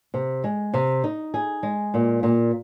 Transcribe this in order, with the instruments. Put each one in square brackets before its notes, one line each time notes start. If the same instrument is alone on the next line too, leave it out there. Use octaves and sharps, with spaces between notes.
[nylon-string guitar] C3
G#3
C3
D#4
G#4
G#3
A#2
A#2